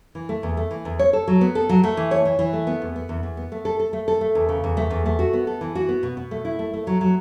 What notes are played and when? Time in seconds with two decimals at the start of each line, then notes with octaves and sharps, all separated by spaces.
0.15 E3
0.29 A3
0.43 E2
0.57 A3
0.71 E3
0.85 E2
0.99 C#5
1.13 A4
1.28 F#3
1.41 B3
1.55 A4
1.69 F#3
1.83 A3
1.97 E3
2.11 C#5
2.25 E3
2.39 E3
2.53 A3
2.67 B3
2.82 E2
2.96 B3
3.09 E2
3.23 E2
3.37 B3
3.52 A3
3.65 A4
3.80 A4
3.93 A3
4.08 A4
4.21 A3
4.35 E2
4.49 C#3
4.64 E2
4.77 A3
4.90 E2
5.06 A3
5.19 F#4
5.33 B3
5.47 A4
5.61 E3
5.75 F#4
5.89 B3
6.03 B2
6.17 B2
6.31 A3
6.45 E4
6.59 A3
6.73 A3
6.87 F#3
7.01 F#3